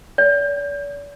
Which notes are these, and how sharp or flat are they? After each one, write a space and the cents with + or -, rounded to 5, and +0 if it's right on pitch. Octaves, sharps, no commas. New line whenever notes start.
D5 -45